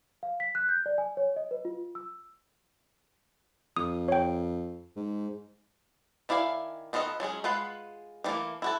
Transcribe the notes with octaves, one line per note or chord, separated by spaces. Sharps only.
F5
B6
F#6
G6
D5
G#5
C#5
D#5
B4
F4
E6
F2 D#6
C#5 G5
G#2
D#3 E4 D5 F5 G#5
D#3 B3 F4 A4 D#5
F#3 G#3 C#4 G#4
G#3 F4 B4 F#5
D#3 E3 G3 A3 A#3
E4 F#4 A4